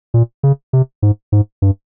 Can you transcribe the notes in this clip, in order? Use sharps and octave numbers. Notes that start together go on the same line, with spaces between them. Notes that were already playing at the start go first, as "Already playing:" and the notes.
A#2
C#3
C3
G#2
G#2
G2